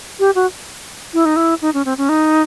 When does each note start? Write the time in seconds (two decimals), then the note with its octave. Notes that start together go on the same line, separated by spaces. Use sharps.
0.19 G4
0.35 F#4
1.14 E4
1.25 D#4
1.36 E4
1.61 D#4
1.74 C#4
1.85 C4
1.98 C#4
2.09 D#4